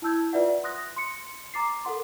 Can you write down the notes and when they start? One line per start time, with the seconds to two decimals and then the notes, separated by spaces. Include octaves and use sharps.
0.02 E4 A5 E6 G6 G#6
0.33 F4 B4 D5 E5 F#5
0.63 C6 D#6 F#6 A#6
0.96 C6 C#7
1.54 A#5 D6 A6 C7
1.85 A4 A#4 F#5 C6